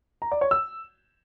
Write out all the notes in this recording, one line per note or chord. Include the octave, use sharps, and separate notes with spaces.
A#5
D5
C#5
E6